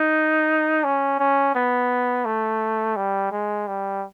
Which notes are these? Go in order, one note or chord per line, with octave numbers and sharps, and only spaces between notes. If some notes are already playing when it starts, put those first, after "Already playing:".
Already playing: D#4
C#4
C#4
B3
A3
G3
G#3
G3